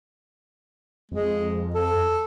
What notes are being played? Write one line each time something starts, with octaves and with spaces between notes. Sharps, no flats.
F2 G#3
A4